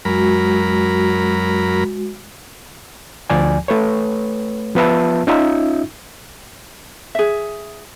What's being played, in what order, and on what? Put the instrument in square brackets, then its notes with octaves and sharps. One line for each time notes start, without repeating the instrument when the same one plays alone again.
[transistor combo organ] F#2 A#4 B5 [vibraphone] G#3 F#4
[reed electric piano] D2 F3 D5 G#5
A3 B4 C#5
F3 B3 F4 B4 E5 A5
C#4 D#4 F4 E5
[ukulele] G#4 E5